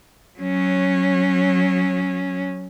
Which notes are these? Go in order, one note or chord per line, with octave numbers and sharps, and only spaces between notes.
F#3 C#4